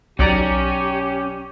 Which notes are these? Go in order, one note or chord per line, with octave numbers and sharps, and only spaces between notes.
B1 C#4 G4 D5 A#5